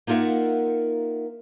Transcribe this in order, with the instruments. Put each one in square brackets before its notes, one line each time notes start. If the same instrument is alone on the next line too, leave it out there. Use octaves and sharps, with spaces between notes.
[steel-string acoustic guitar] A#3 D#4 F4 A#4 E5 F#5